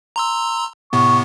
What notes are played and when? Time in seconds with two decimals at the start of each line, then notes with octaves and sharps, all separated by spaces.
0.16 A#5 C6 E6
0.93 A2 C3 B3 C#6